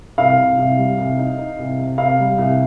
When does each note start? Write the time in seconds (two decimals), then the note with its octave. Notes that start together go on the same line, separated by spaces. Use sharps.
0.18 C2 F5
0.38 C2
0.58 C2
0.78 G3
0.98 C2
1.18 D#4
1.38 D#4
1.58 C2
1.79 C3
1.98 C3 F5
2.19 G3
2.38 C2